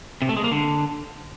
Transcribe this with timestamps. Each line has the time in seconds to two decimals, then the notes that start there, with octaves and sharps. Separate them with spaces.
0.22 C3
0.29 A3
0.37 G#3
0.44 A#3
0.52 D3